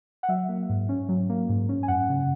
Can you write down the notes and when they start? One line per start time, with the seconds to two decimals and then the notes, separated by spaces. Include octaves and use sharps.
0.23 F#5
0.29 F#3 E5
0.49 A#3
0.69 G#2
0.89 C#4
1.09 F#3
1.29 A#3
1.49 G#2
1.69 C#4
1.83 G#5
1.88 F#2 F#5
2.09 C#3